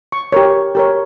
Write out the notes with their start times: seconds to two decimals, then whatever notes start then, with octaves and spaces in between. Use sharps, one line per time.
0.12 C#6
0.32 G4 A#4 C#5
0.75 G4 A#4 C#5